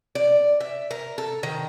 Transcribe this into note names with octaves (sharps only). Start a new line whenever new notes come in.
D5
E5
A#4
A4
D#3